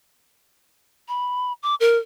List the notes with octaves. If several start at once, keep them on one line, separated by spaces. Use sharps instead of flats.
B5
D6
A#4